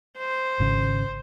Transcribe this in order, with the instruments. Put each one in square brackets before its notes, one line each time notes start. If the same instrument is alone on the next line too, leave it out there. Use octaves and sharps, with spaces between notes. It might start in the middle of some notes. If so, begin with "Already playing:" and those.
[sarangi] C5
[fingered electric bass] G#1 C#3